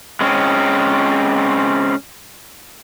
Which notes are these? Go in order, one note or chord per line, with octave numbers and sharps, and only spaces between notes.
G#3 C4 C#4